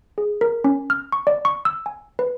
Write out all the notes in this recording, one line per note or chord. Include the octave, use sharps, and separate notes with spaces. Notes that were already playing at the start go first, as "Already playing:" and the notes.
G#4
A#4
C#4
F6
C#6
D5
C#6
E6
G#5
B4